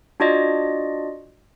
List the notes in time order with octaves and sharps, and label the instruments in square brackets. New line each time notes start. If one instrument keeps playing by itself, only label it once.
[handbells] D4 F4 F#4 D5 D#5